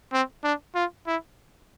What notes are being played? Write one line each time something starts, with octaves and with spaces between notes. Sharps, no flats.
C4
D4
F4
E4